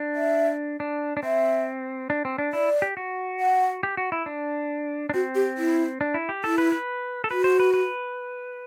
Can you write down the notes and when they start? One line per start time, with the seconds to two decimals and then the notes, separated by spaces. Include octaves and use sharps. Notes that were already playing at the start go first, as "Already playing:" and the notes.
Already playing: D4
0.15 E5
0.80 D4
1.17 D4
1.23 C4 E5
2.10 D4
2.25 C4
2.38 D4
2.53 E4 D5
2.82 G4
2.97 F#4
3.40 F#5
3.83 G4
3.97 F#4
4.12 E4
4.26 D4
5.09 D4
5.14 C4 F#4
5.35 G4
5.57 E4
6.01 D4
6.14 E4
6.29 G4
6.44 E4 A4
6.58 B4
6.72 B4
7.24 A4
7.31 F#4 B4
7.44 C5
7.60 B4
7.74 B4